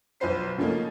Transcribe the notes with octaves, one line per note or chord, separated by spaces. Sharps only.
B1 F3 B4 C5 C7
C#3 F3 A3 A#3 C#4 D#4